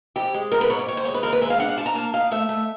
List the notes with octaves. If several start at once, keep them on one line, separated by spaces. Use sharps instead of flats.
F2 G4
G#3
G#2 A#4
B4
G#2 C#5
D5
D#2 C#5
C5
G#3 C#5
B4
D#2 A#4
B4
G#3 E5
F5
D4 F#5
F5
D4 A5
A#5
A#3 A5
D#4 F5
A3 E5
A3